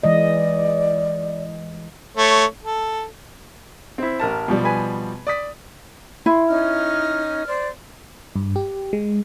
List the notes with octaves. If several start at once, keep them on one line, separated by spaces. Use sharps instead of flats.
E3 G#3 D5 D#5
A3 C#5
A4
C4 E4
A1 A#4 A5
B2 F3 G3
B4 G#5
D5 D#6 B6
E4 C6
C#4 D#4 F6
C5 D5
G2
G4
G#3